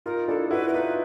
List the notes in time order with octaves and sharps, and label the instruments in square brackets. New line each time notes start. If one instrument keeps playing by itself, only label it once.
[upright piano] D#4 F4 [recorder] A#4
[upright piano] D4 E4 [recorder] A4
[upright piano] E4 F#4 [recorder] B4
[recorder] A#4
[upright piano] D#4 F4 [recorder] B4